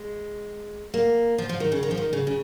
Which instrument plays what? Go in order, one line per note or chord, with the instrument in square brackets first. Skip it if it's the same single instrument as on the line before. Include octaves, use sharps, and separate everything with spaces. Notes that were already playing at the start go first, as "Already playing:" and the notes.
Already playing: [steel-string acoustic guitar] G#3
A#3
F3
F3
D#3
C#3
D#3
F3
D#3
C#3
C#3